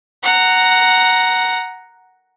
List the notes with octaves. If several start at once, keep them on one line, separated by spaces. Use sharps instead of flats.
F#5 A#5